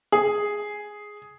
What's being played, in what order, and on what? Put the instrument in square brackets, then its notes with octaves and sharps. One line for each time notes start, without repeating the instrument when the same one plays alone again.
[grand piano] G#4